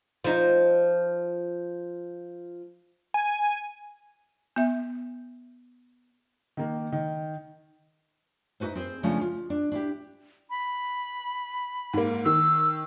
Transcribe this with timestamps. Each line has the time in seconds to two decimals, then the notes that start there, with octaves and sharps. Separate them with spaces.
0.24 F3 D#4
3.14 G#5
4.56 B3 E5
6.57 D#3 A#3
6.92 D#3
8.60 D#4 E4 F#4 B4 C5
8.75 C4 G#4 C5
9.03 C#3 F3 G#3 A3 C#4 D4
9.21 F4
9.50 D4
9.72 D4 E4 G4
10.50 B5
11.93 G#2 A#3
12.25 D#3 E6